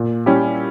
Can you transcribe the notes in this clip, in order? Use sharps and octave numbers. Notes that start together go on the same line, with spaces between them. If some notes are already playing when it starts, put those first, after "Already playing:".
Already playing: A#2
G3 C#4 E4 G4